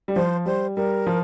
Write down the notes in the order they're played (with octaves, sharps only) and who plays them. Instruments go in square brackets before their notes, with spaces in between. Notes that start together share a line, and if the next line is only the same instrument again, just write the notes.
[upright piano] G3
[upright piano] F3 [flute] C5
[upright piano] G3 [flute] C5
[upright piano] G3 [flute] A#4
[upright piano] F3